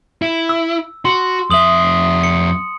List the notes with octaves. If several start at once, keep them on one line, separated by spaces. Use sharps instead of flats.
E4
E6
F#4 C6
F2 E5 D#6 F#7
C#7